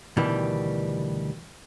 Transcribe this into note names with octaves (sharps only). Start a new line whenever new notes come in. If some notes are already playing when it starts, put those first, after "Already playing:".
D2 B2 D#3 E3 G3